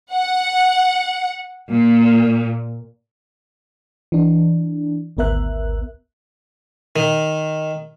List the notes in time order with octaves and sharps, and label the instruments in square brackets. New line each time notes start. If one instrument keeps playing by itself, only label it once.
[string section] F#5
A#2
[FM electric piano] E3 D4
G#1 D2 B3 A#4 E5 F#6
[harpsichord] D#3